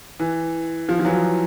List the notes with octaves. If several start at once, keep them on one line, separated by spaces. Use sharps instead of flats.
E3
F3
F3
E3 F#3